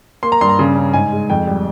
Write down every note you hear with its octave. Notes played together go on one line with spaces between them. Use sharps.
A#3 C6
A#5
G2 C6
A#5
C#3
C#4
G#2 G#5
G#3
F2 G5
G3